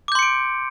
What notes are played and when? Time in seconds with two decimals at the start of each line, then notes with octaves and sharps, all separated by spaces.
0.08 D6
0.12 G6
0.15 C6
0.19 C#7
0.22 D7